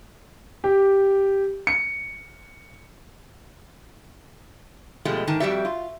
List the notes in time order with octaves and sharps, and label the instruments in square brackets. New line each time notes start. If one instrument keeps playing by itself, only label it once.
[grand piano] G4
C#7
[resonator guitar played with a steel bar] B2 F3 G#3 A3 G4
G#2 D#3 A5
F2 G3 F#4 G4 D5 E5
F4